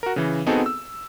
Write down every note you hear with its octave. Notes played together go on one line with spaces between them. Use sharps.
F#4 A#4
C#3 E3
B3 C4 D#4 F#4 G#4 A4
E6